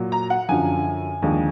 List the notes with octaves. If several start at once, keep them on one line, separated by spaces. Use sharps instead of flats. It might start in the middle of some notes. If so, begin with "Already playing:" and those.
Already playing: A#2 F#3
A#5
F#5
F#2 D3 F3 G#5
D#2 D3 F3 G#3